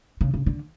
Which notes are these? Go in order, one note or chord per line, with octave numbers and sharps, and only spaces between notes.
C#3
C#3
D3